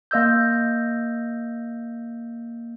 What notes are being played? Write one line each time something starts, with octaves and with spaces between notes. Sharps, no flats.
A#3 D#5 E6 G6